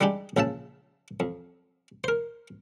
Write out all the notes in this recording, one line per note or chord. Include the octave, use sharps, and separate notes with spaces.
G3 G#3 D4 D#4 G4
A#1 C#3 E5 A5
F2
A#4 C5